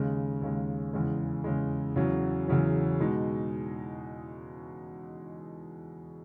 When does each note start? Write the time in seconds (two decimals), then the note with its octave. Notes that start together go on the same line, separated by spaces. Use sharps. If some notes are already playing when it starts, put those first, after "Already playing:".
Already playing: D#2 C#3 G#3
0.42 D#2 C#3 G#3
0.93 E2 C#3 G#3
1.44 E2 C#3 G#3
1.96 E2 C#3 F#3
2.48 E2 C#3 F#3
3.00 B2 G#3 D#4